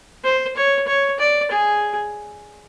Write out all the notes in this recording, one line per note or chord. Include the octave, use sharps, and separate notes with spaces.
C5
C#5
C#5
D5
G#4